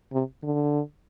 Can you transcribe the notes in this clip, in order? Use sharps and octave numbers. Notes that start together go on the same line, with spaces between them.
C3
D3